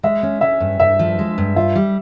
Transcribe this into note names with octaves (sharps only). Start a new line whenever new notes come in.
G#3 E5
C#4
C#4 E5
G2
G2 E5
F3
G#3
G2
F4 E5
G3